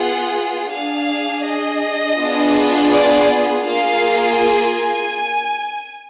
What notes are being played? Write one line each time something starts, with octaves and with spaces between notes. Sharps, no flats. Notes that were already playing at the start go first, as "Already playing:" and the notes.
Already playing: B3 F4 G#4 F#5
D4 G#4 F5
D#5
B3 D4 F4 G#4
D5
A#3 F4 G#4 F5
G#5